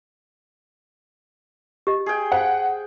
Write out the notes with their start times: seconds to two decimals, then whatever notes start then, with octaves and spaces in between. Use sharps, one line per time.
1.87 G4 D#5
2.06 G#4 G5
2.32 C5 F5 F#5